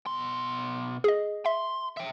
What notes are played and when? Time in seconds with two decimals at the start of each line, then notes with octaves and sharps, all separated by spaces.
0.06 B2 C6
1.04 G#4 D#5
1.46 E5 C6
1.97 E5 G5